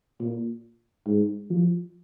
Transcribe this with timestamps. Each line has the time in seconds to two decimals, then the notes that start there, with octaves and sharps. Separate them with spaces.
0.21 A#2
1.06 G#2
1.50 F3